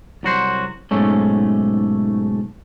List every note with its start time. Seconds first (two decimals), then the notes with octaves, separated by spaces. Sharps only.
0.23 C2 F#3 F#4 C5
0.91 B1 G#2 A3 C#4